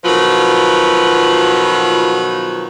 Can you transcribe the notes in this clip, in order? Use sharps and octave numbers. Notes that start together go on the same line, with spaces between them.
B2 D#3 F3 F#3 F4 B4